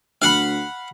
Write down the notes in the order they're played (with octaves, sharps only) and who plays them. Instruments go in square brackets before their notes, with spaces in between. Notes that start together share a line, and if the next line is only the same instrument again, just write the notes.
[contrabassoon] D2 [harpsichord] F5 F#5 B5